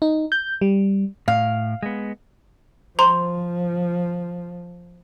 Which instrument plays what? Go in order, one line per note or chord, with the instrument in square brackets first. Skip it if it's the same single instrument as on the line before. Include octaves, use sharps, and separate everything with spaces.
[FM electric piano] D#4
G6
G3
[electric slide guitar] A2 [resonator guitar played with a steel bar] F5
[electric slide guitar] G#3 B3
[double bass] F3 [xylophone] C5 A#5 C6